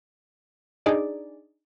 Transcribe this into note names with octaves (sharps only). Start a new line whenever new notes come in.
D4 D#4 G#4 D5